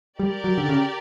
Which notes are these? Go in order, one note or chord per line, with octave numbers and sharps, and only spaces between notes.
G3 G4 A#4 D5
F#3
D3
C#3